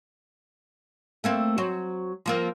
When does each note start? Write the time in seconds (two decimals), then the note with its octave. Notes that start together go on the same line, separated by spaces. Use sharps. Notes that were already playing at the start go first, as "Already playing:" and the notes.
1.24 A3 A#3 C4
1.58 F#3 C5
2.26 F3 A#3 C4